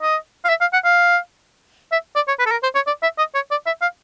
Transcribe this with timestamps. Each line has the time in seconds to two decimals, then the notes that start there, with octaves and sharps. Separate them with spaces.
0.02 D#5
0.45 F5
0.49 E5
0.61 F5
0.73 F#5
0.85 F5
1.92 E5
2.16 D5
2.28 C#5
2.39 B4
2.46 A4
2.51 A#4
2.63 C5
2.75 C#5
2.87 D5
3.03 E5
3.18 D#5
3.35 C#5
3.51 D5
3.66 E5
3.82 F5